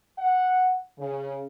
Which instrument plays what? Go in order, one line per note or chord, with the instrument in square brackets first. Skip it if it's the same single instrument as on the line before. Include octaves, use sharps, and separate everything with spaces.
[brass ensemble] F#5
C#3